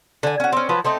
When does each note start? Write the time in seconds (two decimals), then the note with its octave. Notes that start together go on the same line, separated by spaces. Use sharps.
0.23 D3 G#5
0.40 C#4 F#4
0.53 C4 C#4
0.69 F3 F#3 B4
0.84 A3 C4 D#4